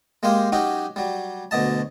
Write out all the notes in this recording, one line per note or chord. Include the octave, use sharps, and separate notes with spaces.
G#3 A#3 G4 C5 F5 G#5
F#3 C#4 D#4 F#4 G4
F#3 G3
D2 B2 F#3 D#5 A5